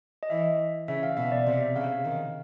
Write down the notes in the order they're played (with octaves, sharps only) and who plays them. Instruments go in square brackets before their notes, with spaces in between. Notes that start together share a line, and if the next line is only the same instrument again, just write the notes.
[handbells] D#5
[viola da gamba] E3 [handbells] E5
[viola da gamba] C#3 [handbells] E5
[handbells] F5
[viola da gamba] B2 [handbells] E5
[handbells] D5
[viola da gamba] C3
[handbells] E5
[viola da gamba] C#3 [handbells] F5
[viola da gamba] D#3